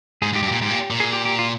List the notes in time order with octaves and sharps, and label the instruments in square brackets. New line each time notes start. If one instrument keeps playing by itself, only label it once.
[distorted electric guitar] G#2 [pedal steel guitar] G#4
[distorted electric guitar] G#2
[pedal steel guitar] G4
[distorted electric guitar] G2
[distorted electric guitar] A#2 [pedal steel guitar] G4
[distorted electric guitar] G#2 [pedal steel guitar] G4
[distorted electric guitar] A#2
A#2
[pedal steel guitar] G#4
G4
G4
F4